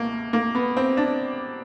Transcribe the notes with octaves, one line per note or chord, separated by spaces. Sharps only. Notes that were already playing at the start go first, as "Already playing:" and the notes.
Already playing: C#2 B2 A3 A#3
A#3
B3
C4
D4